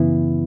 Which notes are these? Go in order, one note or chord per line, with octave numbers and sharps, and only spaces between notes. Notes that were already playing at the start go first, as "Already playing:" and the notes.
Already playing: F#2 C#3 E3 B3 E4